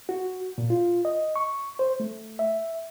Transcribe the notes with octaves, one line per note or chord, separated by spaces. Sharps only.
F#4
A#2
F4
D#5
C#6
C5
A3
E5